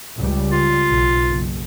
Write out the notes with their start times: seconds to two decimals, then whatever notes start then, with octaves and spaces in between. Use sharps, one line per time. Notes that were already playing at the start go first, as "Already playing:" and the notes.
0.18 C#2 G3
0.52 F4
0.89 B1
1.27 F#1